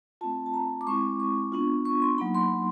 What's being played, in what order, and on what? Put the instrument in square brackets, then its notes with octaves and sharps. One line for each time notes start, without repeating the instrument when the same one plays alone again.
[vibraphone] A3 C4 F4 A5
A5
A#5
D6
G#3 C4 E4 C#6
C#6
B3 D4 F4
C#6
C6
F#3 A#3 D#4 B5
C6